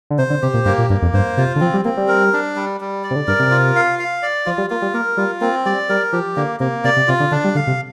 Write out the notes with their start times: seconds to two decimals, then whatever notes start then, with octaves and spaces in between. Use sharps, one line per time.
0.10 D3
0.18 C3 C5
0.30 D3
0.42 C3 G4
0.54 A#2
0.65 G2 A#3
0.78 A#2
0.90 G2 A#3
1.02 F2
1.13 G2 C5
1.37 C3 F4
1.56 D3
1.61 F3 C4
1.74 G3
1.85 A#3 C4
1.97 G3
2.08 A#4
2.33 D4
2.56 G3
2.81 G3
3.04 D5
3.11 C3
3.16 D3
3.28 G2 A#4
3.39 C3
3.51 F4
3.76 F5
3.99 F5
4.22 D5
4.46 F3 F4
4.58 G3
4.70 A#3 F4
4.82 G3
4.94 A#3 A#4
5.17 G3 F4
5.41 A#3 C4
5.66 G3 D5
5.89 G3 A#4
6.12 F3 G4
6.36 D3 A#3
6.60 C3 A#3
6.84 C3 D5
6.97 C3
7.07 C3 F4
7.20 D3
7.31 D3 D4
7.44 G3
7.55 D3 F5
7.67 C3